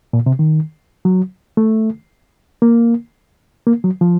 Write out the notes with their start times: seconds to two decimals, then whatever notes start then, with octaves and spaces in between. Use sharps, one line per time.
0.13 A#2
0.26 C3
0.39 D#3
1.05 F#3
1.57 A3
2.62 A#3
3.67 A#3
3.84 F#3
4.01 F3